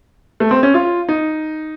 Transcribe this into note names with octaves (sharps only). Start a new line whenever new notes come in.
A3
C4
C#4
F4
D#4